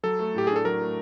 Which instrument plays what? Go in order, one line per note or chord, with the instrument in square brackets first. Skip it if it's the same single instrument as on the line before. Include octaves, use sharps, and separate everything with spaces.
[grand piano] F#3 [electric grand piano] A4
[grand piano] A3
[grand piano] A2 [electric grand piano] G4
[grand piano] D4 [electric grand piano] G#4
[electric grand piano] A4
[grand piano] F#3 [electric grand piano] A#4
[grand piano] A3